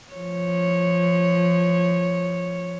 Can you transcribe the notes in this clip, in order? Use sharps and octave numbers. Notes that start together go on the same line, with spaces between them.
F3 C#5